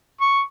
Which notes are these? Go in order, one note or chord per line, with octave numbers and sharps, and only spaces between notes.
C#6